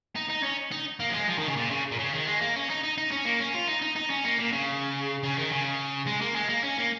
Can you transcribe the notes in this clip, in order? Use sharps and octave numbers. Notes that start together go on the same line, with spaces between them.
D#4
D#4
C#4
D#4
A#3
F3
G#3
F3
D#3
C#3
A#2
C#3
A#2
C#3
D#3
G#3
A#3
C#4
D#4
D#4
D#4
C#4
A#3
C#4
F4
D#4
D#4
D#4
C#4
A#3
A#2
C#3
C#3
D#3
C#3
G#3
A#3
G#3
A#3
C#4
A#3